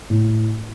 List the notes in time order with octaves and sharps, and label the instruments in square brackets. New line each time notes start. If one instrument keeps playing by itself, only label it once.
[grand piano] A2